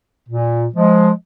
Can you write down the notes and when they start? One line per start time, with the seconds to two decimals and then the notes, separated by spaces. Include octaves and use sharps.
0.29 A#2
0.74 F3 G#3